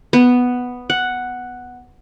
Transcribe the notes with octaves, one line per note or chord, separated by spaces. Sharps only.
B3
F#5